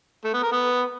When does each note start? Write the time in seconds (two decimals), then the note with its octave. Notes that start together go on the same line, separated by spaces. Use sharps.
0.25 A3
0.34 B3
0.43 A#4
0.52 B3